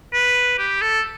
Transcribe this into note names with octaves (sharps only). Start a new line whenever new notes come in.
B4
G4
A4